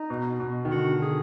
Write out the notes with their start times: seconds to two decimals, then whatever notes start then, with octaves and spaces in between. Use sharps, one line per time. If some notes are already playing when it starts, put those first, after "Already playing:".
Already playing: D#4
0.10 B2
0.40 B2
0.65 D#3
0.71 D3 F#4
0.92 D3
1.02 G#4